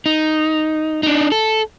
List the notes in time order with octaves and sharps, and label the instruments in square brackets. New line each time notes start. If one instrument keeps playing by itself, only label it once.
[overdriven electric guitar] D#4
D4 D#4
A4